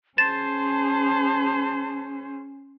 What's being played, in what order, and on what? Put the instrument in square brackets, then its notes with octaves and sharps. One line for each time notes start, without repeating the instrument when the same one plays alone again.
[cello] C#4 [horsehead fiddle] G#4 C5 [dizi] A5 [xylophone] A6 E7